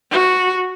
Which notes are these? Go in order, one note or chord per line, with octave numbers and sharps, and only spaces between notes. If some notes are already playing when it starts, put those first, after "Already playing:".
F#4